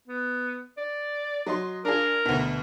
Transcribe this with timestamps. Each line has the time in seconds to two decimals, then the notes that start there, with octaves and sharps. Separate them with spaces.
0.07 B3
0.77 D5
1.46 F#3 D#5 C6
1.85 D4 F4 G#4 A#4
2.25 D2 B2